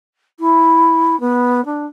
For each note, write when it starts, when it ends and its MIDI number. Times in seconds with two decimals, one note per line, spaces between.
0.39 1.19 64
1.20 1.64 59
1.65 1.86 62